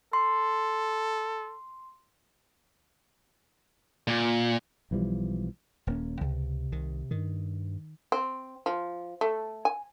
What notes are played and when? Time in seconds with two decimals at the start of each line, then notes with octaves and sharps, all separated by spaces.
0.13 A4 C6
4.08 A#2
4.91 B1 E3 F3 G3
5.87 D#1 A#3 C#4
6.21 C#2 C3
6.72 C2 D#3
7.11 G2 D#3
8.12 C4
8.66 F3
9.21 A3
9.65 G#5